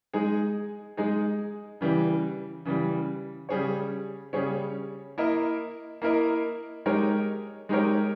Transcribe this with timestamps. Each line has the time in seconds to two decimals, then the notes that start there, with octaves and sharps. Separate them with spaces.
0.13 G#3 D#4 G#4
0.97 G#3 D#4 G#4
1.81 C#3 E3 G3
2.65 C#3 E3 G3
3.49 C#3 G3 C#4 G#4 C#5
4.33 C#3 G3 C#4 G#4 C#5
5.18 A#3 E4 A#4 D#5
6.02 A#3 E4 A#4 D#5
6.86 G#3 D#4 G4 A#4 C#5
7.69 G#3 D#4 G4 A#4 C#5